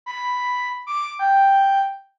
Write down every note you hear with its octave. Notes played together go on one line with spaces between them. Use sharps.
B5
D6
G5